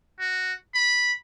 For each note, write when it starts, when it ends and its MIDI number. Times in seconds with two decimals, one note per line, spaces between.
0.19 0.53 66
0.74 1.13 83